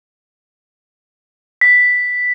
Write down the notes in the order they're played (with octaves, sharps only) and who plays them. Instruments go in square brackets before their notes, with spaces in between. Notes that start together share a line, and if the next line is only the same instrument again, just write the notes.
[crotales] B6